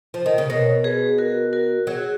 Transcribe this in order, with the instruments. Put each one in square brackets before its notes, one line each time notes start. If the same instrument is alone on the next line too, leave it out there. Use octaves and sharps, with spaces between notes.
[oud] F3
D#3
C#3
[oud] B2 [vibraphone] A#4 C#5
[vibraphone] G#4 B4
F#4 A#4
F#4 A#4
[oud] F#3 [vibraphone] G#4
[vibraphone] F#4